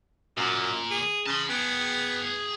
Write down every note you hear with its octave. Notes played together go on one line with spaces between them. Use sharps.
F#2 A#2
G#4
C#3 A5 C6
B3 G#4 G5